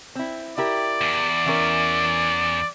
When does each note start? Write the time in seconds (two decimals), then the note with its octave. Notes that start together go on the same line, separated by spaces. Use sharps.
0.15 C4 E4
0.58 E4 G4 A#4 D5
1.01 E2
1.46 E3 C#4 A#4